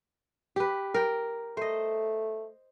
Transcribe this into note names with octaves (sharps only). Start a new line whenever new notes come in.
G4 B4
A#4 G5
A3 C5 D#5